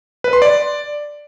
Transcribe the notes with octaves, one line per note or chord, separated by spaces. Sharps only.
B4
C6
D5